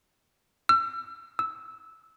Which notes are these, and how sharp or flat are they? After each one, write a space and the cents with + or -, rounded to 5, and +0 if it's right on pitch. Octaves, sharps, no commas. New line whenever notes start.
E6 +35
E6 -15